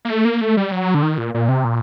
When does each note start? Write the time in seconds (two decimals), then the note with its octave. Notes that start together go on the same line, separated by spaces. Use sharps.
0.05 A#3
0.10 A3
0.25 A#3
0.41 A3
0.57 G3
0.72 F#3
0.94 D3
1.03 D#3
1.18 A#2
1.34 A#2
1.49 C3
1.64 A#2